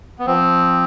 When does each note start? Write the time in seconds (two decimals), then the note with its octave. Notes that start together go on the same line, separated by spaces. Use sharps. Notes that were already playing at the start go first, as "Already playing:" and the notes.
0.19 B3
0.26 F3 C4